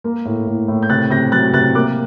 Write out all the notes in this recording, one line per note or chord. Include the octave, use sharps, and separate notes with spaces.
A#3
A2
A2
A2
G6
C3 F#6 A6
C3 G6 A#6
F#3 F#6 A6
C3 F#6 A6
A#3 D6 F#6